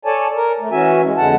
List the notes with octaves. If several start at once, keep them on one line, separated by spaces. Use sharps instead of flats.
A4 C#5 D5 G#5 A5
A#4
A3
E3 C#4 F#4 E5 G#5
G#3
F2 D3 G#3 F#5 A5